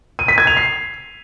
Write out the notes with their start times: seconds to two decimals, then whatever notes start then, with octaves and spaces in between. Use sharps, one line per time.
0.19 D#7
0.28 B6
0.38 G#6
0.47 F7
0.57 C7